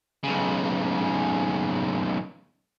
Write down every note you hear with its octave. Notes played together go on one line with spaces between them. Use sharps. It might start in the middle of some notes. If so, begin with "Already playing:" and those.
B1 C#3